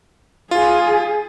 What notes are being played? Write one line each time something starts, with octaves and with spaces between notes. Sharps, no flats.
F4 G#4